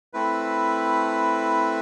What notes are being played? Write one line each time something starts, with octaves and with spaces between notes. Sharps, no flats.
A3 C4 E4 B4